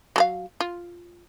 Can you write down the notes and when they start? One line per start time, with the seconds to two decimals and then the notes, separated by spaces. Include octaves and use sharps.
0.16 F#3 A4 F5
0.60 F4